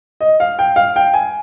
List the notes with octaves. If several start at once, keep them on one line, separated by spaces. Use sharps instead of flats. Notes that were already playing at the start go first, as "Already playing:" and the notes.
D#5
F5
G5
F5
G5
G#5